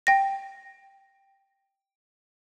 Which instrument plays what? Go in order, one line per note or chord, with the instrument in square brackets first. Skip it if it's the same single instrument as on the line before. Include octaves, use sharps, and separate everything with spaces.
[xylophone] G5 A#6